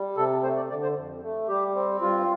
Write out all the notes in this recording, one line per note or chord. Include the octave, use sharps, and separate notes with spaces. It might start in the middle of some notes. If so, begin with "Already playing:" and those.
Already playing: G3
C3 A4
A3 C5
D5
D3 D5
C5
F2
A3
G3 G4
C4
G2 F4